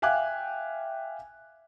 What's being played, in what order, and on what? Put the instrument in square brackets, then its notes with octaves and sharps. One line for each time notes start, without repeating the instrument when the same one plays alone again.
[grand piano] E5 F5 G5 G#5 D6 F#6